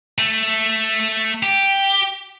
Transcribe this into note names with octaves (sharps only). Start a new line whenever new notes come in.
A3
G4